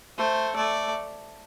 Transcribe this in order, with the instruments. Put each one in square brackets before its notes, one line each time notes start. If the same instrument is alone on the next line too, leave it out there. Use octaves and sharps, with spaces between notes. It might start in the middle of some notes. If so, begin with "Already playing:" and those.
[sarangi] A3 [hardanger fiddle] C5
[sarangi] A3 [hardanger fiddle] D5